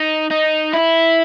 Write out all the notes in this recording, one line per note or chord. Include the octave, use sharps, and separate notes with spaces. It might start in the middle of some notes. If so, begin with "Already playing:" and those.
Already playing: D#4
D#4
E4